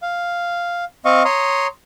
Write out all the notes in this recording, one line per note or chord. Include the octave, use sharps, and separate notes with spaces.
F5
C4 D#5 F5 C#6
C#5 A#5 C6 D#6